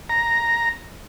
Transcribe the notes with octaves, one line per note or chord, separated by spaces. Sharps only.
A#5